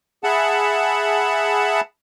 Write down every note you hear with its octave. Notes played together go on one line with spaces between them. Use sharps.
G#4 E5 F#5 A5 B5